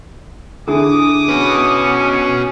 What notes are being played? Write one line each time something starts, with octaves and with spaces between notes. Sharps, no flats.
D3 E4 G#4 D6 D#6
C#4 F#4 B4